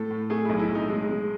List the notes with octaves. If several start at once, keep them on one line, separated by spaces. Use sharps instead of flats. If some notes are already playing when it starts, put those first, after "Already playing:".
Already playing: A2 A3 A4
A2
A3 G#4
B1 E4
E4
B1
D#4
G#3 D#4
G#3